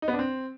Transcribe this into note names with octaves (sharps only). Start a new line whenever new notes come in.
D#4
B3
D4
C4